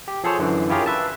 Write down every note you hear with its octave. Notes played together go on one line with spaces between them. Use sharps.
G4
F3 G#4 A4 C5 C#5
F#2 D3 E3
E4 F4 G4 G#4 A#4 C#5
B4 E5 A5